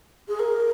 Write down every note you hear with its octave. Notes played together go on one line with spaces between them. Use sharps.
G#4
A#4